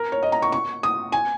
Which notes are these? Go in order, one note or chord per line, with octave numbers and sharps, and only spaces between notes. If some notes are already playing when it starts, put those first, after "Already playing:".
Already playing: A#4
C#5
D#5
A#5
C#6
C#6
D#6
G#5